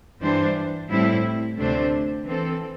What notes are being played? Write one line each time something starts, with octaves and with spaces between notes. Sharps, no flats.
G2 E3 G3 D4 C5
A2 G3 C4 E4
D2 C3 A3 D4 C5
E3 C4 A4